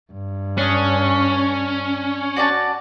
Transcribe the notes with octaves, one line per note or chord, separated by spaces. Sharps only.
G2
C#4 D4 D#6
F#4 D5 A5